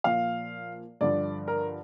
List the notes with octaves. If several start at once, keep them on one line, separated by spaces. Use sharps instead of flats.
A#2 F3 F5
G2 D3 F3 D5
A#4